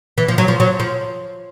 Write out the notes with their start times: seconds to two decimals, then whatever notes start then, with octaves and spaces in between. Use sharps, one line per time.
0.18 E3
0.28 F3
0.38 F#3
0.48 F3
0.60 F#3
0.80 F3